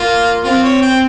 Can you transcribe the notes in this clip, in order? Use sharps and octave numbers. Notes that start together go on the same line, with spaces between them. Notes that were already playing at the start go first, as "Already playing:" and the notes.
Already playing: A#3 F4
C4 F4
C#5
G5